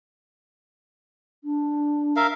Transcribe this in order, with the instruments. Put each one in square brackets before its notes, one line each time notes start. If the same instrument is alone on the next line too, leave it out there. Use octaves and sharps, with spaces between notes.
[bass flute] D4
[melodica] A#4 E5 F5